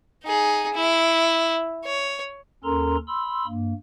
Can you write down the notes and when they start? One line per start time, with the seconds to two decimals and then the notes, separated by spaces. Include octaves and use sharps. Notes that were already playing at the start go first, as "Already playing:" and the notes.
0.24 D#4 G#4
0.74 E4
1.85 C#5
2.64 D#2 C#4 A4 A#4 A#5 C6
3.08 B5 C6 E6
3.47 G2 A#3